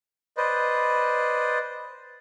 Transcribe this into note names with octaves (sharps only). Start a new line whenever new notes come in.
B4 C5 D5 D#5